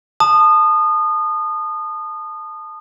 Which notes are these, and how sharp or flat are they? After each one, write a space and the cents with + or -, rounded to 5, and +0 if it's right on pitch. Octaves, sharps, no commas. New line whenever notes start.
A5 +0 D#6 -25